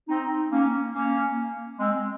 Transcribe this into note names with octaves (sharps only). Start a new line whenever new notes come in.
C4 D#4
A#3 C#4
A#3 C#4
G#3 C4